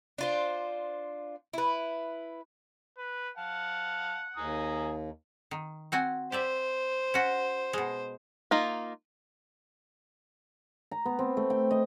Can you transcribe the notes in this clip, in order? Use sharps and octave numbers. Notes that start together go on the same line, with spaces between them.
D4 F4 C5
E4 B4
B4
F5 F#5 A5
D#2 G#5 A#5 D#6
D#3
C4 F#4 G#5
G4 C5 D5 E5
C#4 F#4
B2 G#3
A#3 D#4 F4
A#5
B3
C4
A3
G5
D#5